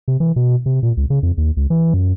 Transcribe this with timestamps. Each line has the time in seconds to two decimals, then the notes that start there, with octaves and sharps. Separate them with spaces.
0.08 C3
0.20 E3
0.36 B2
0.66 C3
0.83 A#2
0.97 C#2
1.10 C#3
1.23 F2
1.38 D#2
1.57 C#2
1.70 E3
1.94 F#2